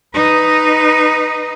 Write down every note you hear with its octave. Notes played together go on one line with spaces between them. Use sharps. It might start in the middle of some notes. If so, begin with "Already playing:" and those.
D#4 B4